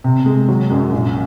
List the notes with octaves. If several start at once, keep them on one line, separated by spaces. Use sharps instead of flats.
C3
G#3
F#3
F#2
A#1